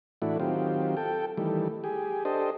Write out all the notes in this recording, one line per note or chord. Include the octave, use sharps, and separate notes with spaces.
A2 E3 A3 D4 E4 F#4
D#3 F#3 C4 F4 G4
A4 G5
D#3 E3 G3 A3
G4 G#4
D4 G4 A4 C5 D#5